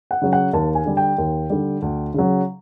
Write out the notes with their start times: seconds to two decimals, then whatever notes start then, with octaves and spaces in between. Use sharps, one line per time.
0.11 F#5
0.22 C#3 F#3
0.33 F#5
0.53 D#2 A5
0.75 G#5
0.85 D3 G3
0.97 G5
1.18 D#2
1.50 D3 G3
1.82 D2
2.14 C#3 F#3